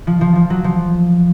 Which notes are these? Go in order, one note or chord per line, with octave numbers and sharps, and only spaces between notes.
F3
F3
F3
F#3
F3